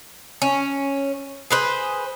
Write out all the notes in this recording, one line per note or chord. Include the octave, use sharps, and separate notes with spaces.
C#4
G#4 B4 C5